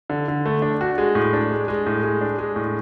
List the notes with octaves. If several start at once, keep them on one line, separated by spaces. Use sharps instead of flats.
D3
D3
A3
D4
F#4
G#3
A2
D4
G#3
G#3
A2
G#3
D4
G#3
A2